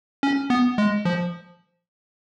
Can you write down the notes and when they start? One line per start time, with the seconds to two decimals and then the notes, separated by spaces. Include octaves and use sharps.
0.23 C#4
0.50 B3
0.78 G#3
1.05 F3